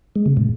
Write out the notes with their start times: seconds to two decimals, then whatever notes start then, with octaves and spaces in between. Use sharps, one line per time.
0.16 G#3
0.26 C#3
0.37 A2